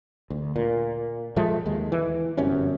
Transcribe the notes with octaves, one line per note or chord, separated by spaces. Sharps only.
D2
A#2
A2 F3 G#3 A3
D#2 G#3
E3
G1 F#2 C3 C#4